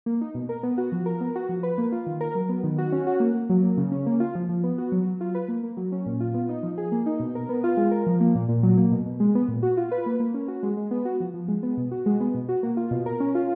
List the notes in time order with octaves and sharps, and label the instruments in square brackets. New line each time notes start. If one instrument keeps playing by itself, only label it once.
[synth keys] A#3
D#4
B2
A#4
B3
F#4
F3
A#4
B3
F#4
F3
B4
A#3
F4
D#3
A#4
F#3
B3
D#3
F#4
C#4
F#4
A#3
A#3
F#3
A#3
C#3
C#4
A#3
F4
F3
F3
B3
F#4
F#3
F#3
F4
B4
A#3
A#3
F#3
C#4
A#2
F4
B3
D#4
F3
G#4
A#3
D#4
B2
A#4
B3
F4
G#3
A#4
F3
A#3
A#2
A#2
F#3
A#3
B2
B2
G#3
B3
A#2
F#4
F4
B4
A#3
A#3
C#4
F#4
G#3
G#3
B3
F#4
F3
F3
G#3
B3
B2
F#4
G#3
B3
B2
F#4
A#3
F4
B2
A#4
C#4
F4